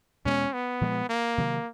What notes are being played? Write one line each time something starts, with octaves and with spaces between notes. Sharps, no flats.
E2 B2 G#3 B3 C#4
B3
A#2 F3 G#3
A#3
C3 D#3 F#3